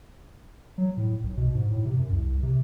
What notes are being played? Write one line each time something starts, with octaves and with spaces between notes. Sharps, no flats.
F#3
A2
B1
B2
G#2
A2
C3
F#2
C2
C3